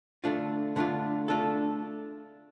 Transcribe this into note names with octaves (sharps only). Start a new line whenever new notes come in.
D3 A3 D4 F4
D3 A3 D4 F4
A3 D4 F4 A4